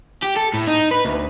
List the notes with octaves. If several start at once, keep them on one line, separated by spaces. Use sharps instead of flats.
G4
A4
A2
D#4
B4
D2